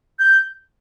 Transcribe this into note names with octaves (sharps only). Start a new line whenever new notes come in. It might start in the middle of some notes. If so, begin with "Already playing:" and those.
G6